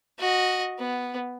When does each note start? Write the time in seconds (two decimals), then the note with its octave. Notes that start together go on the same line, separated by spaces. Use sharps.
0.18 F#4 D#5
0.79 B3